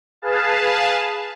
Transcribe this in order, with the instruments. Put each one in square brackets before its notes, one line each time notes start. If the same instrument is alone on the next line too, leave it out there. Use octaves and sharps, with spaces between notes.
[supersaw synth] G#4 B4 F5 A5